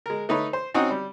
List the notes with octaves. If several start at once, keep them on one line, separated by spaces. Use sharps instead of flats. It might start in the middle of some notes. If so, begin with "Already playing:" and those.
G#3 A#4
A3 D#4 B4 C#5
C5
C4 C#4 D#4 F#4 C#5 D#5
G3